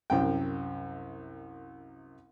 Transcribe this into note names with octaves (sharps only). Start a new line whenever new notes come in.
C2 F#2 G5